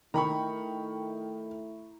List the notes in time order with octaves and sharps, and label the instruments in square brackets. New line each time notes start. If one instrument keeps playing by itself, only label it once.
[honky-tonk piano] D#3 [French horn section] A3 E4 [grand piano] A#5 B5 C#6